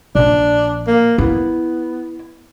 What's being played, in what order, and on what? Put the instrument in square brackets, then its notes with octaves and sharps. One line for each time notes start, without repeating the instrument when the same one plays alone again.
[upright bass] A#1 [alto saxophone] D4
[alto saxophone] A#3
[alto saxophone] B3 [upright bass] E4